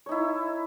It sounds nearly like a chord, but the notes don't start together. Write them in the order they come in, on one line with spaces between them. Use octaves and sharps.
C#5 D#4 E4